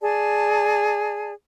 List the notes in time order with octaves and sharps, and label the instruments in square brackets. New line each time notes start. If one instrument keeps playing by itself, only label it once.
[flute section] G#4 D5 A5